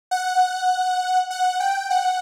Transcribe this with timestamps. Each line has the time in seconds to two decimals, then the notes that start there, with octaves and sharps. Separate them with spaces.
0.11 F#5
1.31 F#5
1.60 G5
1.90 F#5